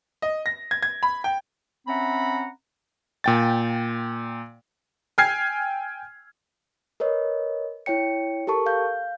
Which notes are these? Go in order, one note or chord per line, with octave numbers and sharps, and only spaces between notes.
D#5
A#6
G#6
G#6
B5
G5
C4 C#4 E5 F#5 A#5 B5
A#2 G5 A6
G5 G#5 F6 G#6 C7
A#4 B4 C#5 D#5
E4 C#5 G5 C#7
G4 A4 A#4 A5 C#6
F5 G6